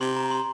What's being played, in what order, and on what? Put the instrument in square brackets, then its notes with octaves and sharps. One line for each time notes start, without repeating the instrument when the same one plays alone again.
[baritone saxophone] C3 [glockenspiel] C6
[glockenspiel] A#5
C6